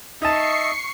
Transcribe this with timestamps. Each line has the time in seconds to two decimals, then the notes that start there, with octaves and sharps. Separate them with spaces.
0.22 D#4 D#5 E5 A5 C#6 C7 C#7